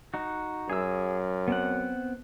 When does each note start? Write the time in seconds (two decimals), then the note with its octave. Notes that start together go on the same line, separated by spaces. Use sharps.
0.14 D#4 F#4
0.70 F#2 G#4 E6
1.48 B3 C4 F#5